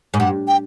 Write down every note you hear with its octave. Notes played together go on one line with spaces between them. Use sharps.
G#2
G2 F#5
G5